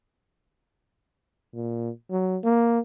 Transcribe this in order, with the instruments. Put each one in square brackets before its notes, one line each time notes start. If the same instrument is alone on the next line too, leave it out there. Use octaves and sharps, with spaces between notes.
[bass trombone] A#2
F#3
A#3